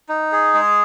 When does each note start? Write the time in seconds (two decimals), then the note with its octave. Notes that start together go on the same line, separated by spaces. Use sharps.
0.09 D#4
0.32 G#4
0.54 G#3